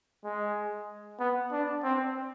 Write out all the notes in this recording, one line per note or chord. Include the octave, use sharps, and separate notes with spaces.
G#3
B3
D4
C4